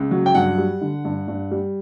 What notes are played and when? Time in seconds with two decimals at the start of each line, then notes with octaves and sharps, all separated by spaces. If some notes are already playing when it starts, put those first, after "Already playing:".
Already playing: C#2
0.11 F#3
0.26 G5
0.35 G2 F#5
0.58 G3
0.81 D3
1.05 G2
1.28 G2
1.51 G3